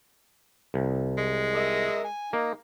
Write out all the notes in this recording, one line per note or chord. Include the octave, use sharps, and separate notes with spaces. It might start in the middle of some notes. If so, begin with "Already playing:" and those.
C2
G#3
A#4 D#5 E5
G#5
A#3 D#4